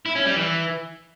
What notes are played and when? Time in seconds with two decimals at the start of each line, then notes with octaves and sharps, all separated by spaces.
0.06 E4
0.16 C#4
0.26 G3
0.36 E3